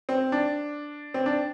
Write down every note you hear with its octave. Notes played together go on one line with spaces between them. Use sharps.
C4
D4
C4
D4